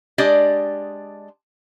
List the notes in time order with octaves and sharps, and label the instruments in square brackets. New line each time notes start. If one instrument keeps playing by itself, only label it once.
[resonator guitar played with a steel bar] G#3 D4 G4 D5 D#5